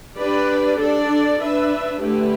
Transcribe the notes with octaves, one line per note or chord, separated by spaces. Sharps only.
D4 G4 B4 D5
D4 A4 D5
D4 B4 E5
D3 A3 E4 G4 B4